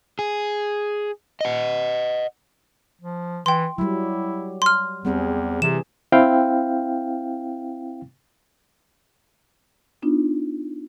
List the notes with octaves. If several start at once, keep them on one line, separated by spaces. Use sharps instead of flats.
G#4
D#5 F#5
F3
E3 G5 C6
F#3 G3 E4
C6 F6
E2 G3 C4 G#4
C3 E3 G#4 E7
C4 E4 F5 G5
B3 D4 D#4 F4